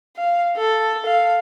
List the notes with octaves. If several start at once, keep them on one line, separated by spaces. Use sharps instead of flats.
F5
A4
F5